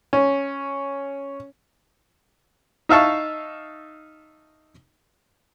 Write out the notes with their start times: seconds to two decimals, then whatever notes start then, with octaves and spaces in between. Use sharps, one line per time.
0.13 C#4
2.89 D#4 E5 F5 A5 C#6